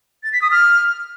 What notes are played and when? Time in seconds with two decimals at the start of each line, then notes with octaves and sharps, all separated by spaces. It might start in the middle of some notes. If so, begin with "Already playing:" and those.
0.23 A6
0.32 B6
0.41 D#6
0.51 F6